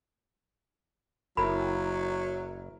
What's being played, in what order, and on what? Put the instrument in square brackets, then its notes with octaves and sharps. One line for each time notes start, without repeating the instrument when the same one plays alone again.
[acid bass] F#1 [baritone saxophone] F#3 [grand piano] E4 A#4 [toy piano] B5